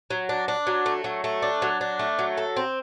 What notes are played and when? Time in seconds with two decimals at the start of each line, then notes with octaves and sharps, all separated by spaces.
0.10 F#3
0.29 D4
0.48 D4
0.67 F#3
0.86 A3
1.04 F#3
1.24 A3
1.42 D4
1.62 F#3
1.81 D4
1.99 A3
2.19 F#3
2.37 A4
2.56 C4